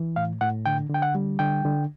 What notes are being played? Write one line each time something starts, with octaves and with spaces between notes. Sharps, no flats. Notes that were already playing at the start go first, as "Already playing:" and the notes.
Already playing: E3
A2 F5
A2 F#5
D3 G5
D3 G5
F#5
G3
D3 G5
D3